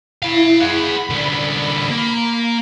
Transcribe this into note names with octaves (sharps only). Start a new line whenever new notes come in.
E4 F5 B5
G#4 F#5 B5
C2 D3
A#3